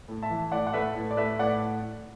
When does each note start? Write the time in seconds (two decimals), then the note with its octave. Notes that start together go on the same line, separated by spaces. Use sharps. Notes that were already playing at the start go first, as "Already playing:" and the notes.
0.08 A2
0.23 E5 A5
0.30 E3
0.52 A2 D5 F#5
0.67 F#5
0.73 A3 B4 E5
0.95 A2
1.11 D5
1.17 A3 B4 E5
1.39 A2 D5 F#5